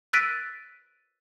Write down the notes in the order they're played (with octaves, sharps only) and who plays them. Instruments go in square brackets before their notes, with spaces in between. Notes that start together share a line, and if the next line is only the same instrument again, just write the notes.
[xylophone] E6 F#6 A6 B6 D7 D#7